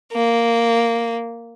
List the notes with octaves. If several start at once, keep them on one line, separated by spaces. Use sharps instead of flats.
A#3